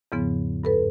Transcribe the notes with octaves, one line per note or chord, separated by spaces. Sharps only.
E2 G#2 C#3 F3 B3
G2 A4 B4